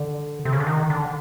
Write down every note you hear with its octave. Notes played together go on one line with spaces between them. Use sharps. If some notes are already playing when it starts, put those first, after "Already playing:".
Already playing: D3
C3
C#3
D3
D#3
D3